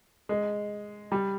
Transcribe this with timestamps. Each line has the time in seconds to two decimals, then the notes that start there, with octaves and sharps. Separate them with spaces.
0.29 G#3
1.12 G3